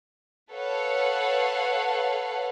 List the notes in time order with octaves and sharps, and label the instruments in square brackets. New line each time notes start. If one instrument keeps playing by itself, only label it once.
[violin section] A4 B4 C#5 F5 F#5